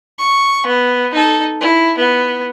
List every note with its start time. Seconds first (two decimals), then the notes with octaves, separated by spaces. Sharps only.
0.19 C#6
0.66 B3
1.14 D#4 A4
1.60 E4
1.98 B3